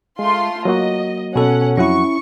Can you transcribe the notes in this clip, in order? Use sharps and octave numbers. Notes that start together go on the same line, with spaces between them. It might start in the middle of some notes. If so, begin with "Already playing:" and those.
G#3 A3 F4 C6
F#3 A#3 F#4 D#5
B2 C#4 A4 F#5
F2 F#3 C#4 E4 F#5 C#6